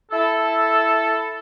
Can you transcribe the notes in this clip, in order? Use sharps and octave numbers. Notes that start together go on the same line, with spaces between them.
E4 A4